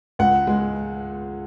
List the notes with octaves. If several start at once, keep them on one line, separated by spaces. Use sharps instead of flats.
C#2 F#5
G#3